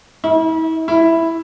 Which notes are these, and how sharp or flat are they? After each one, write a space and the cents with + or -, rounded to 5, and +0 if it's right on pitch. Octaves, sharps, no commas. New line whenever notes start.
E4 -40
E4 +0